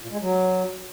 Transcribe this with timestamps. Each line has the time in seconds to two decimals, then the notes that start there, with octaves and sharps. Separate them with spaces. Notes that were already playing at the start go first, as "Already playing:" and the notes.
0.01 A#2
0.11 G#3
0.21 F#3